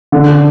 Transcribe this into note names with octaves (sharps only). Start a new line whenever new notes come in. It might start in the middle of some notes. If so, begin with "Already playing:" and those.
D3